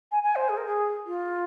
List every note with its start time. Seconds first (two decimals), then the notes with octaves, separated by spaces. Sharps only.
0.12 G#5
0.23 G#5
0.36 C5
0.49 G#4
0.57 A#4
0.66 G#4
1.06 F4